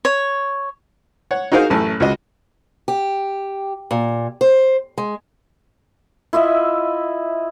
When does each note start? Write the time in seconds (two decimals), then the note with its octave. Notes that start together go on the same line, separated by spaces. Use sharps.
0.05 C#5
1.31 C#5 F#5
1.52 D#4 F#4 G#4 A#4 C5 F5
1.70 A1 F#2 A3 A5
2.00 C#2 F#4 D#5
2.88 G4
3.91 A#2
4.41 C5
4.98 G#3
6.33 E4 F4 D#5 E5